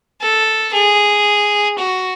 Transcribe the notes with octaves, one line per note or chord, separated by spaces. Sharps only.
A4
G#4
F#4